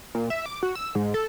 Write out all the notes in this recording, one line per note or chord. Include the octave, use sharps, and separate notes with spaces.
A#2
E5
D6
F#4
E6
G#2
A4